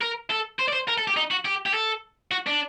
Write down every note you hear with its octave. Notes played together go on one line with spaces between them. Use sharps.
A#4
A4
C5
D5
C5
A#4
A4
G4
D#4
F#4
G4
G4
A4
F#4
D4